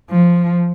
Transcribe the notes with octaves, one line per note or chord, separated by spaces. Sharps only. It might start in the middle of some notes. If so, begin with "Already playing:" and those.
F3